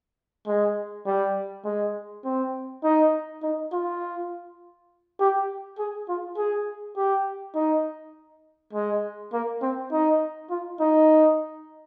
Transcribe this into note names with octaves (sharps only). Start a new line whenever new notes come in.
G#3
G3
G#3
C4
D#4
D#4
F4
G4
G#4
F4
G#4
G4
D#4
G#3
A#3
C4
D#4
F4
D#4